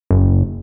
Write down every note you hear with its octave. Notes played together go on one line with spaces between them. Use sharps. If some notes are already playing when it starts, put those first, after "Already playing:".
F#1